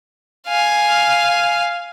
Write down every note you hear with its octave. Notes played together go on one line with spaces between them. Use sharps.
F5 G#5